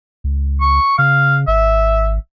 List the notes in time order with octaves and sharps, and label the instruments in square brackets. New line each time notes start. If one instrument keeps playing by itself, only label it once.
[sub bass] C#2
[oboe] C#6
[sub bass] C#3 [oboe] F5
[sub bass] G#1 [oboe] E5